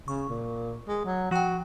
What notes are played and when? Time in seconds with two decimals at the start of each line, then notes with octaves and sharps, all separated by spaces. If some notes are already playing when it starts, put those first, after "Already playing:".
0.08 C#3 C#6
0.29 A#2
0.88 G#3
1.05 F#3
1.31 F3 F#4 G5